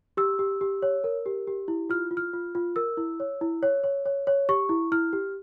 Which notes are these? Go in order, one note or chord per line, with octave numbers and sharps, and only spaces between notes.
G4 E6
G4
G4
C#5
A#4
G4
G4
E4
F4 F6
F4
F6
F4
F4
A#4 E6
E4
C#5
E4
C#5
C#5
C#5
C#5
G4 C#6
E4
E4 F6
G4